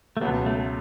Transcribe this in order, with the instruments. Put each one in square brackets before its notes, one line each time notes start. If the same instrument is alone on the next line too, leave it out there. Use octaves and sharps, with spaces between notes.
[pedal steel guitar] A3
[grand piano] C#2 B2 F#3 [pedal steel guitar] B3
[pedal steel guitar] A3